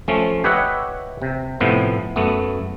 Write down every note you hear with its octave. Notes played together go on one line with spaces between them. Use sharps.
F3 A3 C#4
G4 B4 C#5 D#5 E5 F#5
C3
A2 C3 F3 B3
F#2 A3 B3